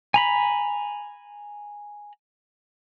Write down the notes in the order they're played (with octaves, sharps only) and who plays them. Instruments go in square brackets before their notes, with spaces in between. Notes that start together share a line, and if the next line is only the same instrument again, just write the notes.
[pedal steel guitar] G#5 A#5 B5